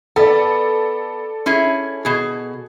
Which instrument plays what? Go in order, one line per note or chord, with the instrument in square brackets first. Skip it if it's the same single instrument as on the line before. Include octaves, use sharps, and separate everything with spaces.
[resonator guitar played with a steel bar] B3 [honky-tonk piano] A4 D5
[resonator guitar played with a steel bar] C#4 E4 G#4
B2 G#4